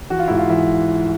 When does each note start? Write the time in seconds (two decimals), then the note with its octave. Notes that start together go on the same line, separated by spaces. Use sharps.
0.10 E3 F#4
0.19 F4
0.28 G#2 E4
0.37 F4
0.49 E3 E4